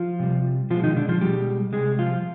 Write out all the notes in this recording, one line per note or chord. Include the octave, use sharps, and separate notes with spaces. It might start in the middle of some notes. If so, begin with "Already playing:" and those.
Already playing: F3 F4
C3 G3
B2 F3 G#3 F4
D#3 D#4
D3 D4
F3 F4
B2 G3 G#3 G4
C3 G3 G#3 G#4
F3 F4